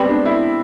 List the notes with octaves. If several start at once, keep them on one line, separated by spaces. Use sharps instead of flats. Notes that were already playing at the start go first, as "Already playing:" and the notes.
Already playing: G3 B3 C4
D4
E4